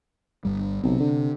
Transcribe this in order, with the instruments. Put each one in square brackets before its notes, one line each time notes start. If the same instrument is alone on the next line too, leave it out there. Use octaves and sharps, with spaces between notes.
[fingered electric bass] G1 G2 G3
[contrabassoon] B1 [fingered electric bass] C3 C4
[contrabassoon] D3